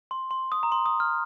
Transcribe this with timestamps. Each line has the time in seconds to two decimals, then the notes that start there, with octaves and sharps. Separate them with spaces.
0.11 C6
0.31 C6
0.52 D#6
0.63 A#5
0.72 C6
0.86 D#6
1.00 F6